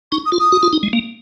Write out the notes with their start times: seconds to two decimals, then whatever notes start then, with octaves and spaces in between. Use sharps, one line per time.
0.12 D#4 C#6
0.25 D#6
0.32 F4
0.39 D#6
0.52 F#4
0.63 F4
0.73 D#4
0.83 G#3
0.93 A#3